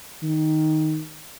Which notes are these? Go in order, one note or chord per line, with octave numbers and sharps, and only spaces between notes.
D#3